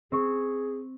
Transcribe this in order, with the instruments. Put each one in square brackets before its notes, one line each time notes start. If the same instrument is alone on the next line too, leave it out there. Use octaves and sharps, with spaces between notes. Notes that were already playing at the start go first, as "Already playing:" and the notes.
[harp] C4 C#6 [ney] G#4